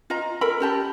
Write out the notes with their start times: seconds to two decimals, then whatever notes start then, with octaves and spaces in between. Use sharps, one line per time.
0.10 F4 D#5 A#5
0.41 A4 A#4 B5
0.60 C#4 G4 A5